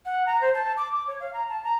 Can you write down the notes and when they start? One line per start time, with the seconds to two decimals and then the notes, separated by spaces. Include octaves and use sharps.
0.06 F#5
0.26 A#5
0.41 C5
0.54 A5
0.77 D6
0.92 D6
1.07 C#5
1.20 F5
1.34 A#5
1.49 A5
1.64 A#5